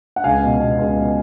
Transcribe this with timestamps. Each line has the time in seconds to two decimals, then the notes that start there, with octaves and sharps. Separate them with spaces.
0.16 F#5
0.24 C#2 F5 G#5
0.43 B2
0.60 B2
0.78 C#2
0.96 B2